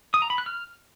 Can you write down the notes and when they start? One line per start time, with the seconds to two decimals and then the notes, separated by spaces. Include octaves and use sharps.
0.14 D#6
0.22 A#5
0.30 B5
0.38 F#6
0.46 F6